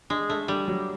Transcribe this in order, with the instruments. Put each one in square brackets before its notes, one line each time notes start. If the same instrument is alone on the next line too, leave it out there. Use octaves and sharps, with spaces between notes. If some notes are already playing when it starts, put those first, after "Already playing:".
[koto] G#3 [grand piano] D4
[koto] A3 [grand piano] D4
[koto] G3 [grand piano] D4
[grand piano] F#3